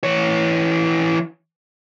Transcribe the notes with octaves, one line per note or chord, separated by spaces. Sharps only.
E3 C#5